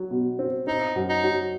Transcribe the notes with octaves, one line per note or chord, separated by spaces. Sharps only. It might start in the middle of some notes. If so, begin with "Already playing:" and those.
Already playing: F#3
B2
C4
C4 D#4
F#2
D#4
F#3